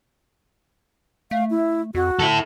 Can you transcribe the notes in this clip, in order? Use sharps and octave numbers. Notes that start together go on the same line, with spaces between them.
A3 F5
E4
F2 F#4
D3 E4 A4